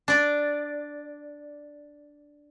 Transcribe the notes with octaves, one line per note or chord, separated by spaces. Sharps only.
D4 D5